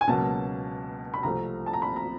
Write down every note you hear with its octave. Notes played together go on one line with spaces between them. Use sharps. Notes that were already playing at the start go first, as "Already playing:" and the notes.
G#5
C#2 B2 F#3 A#3 A5
B5
C2 C3 F3 A3 A#5
A5
A#5
B5
A#5